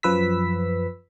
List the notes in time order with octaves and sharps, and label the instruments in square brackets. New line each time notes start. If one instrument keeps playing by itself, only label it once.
[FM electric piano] F#2 F3 B4 E6 B6